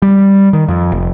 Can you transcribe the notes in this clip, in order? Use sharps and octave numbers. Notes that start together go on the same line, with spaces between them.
G3
D#3
F2
F1